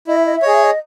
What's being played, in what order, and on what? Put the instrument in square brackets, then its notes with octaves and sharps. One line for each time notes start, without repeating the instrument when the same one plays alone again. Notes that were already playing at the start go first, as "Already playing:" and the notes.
[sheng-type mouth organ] E4 [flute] D#5
[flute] E5
D#5
E5
[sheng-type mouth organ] G#4 C#5 [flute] D#5
[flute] E5
D#5